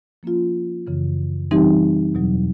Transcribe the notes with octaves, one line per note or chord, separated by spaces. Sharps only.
F3 A#3 C#4 F4
F#2 C#3 E3
E3 G3 C4 D#4 G4
E2 B2 F#3